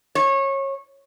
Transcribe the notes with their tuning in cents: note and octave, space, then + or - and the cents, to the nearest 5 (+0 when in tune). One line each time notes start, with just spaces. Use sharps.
C#5 -25